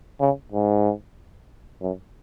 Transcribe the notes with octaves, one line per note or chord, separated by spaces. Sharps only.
C#3
G#2
F#2